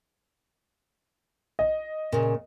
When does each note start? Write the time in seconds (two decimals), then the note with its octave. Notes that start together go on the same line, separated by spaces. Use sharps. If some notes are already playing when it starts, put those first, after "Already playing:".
1.59 D#5
2.12 A#2 C#3